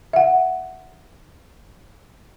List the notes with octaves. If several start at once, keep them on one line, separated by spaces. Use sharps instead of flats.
E5 F#5